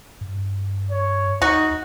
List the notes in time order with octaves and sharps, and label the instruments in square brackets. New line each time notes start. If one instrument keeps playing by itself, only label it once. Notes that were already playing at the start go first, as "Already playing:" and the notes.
[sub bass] G2
[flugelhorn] C#5
[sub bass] D#2 [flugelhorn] D#4 [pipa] F#4